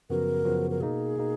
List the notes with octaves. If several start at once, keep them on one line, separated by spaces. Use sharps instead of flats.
F#2 C#3 F3 B3 F#4 A#4
F#2 C#3 F3 B3 F#4
A#4
B2 A#3 D#4 G#4
B2 A#3 D#4